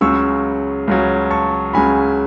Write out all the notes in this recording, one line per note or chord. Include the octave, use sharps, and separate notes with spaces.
C#2 C#3 F#3 C#6 E6
C#2 C#3 F#3
A5 C#6
C#2 C#3 F#3 G#5 B5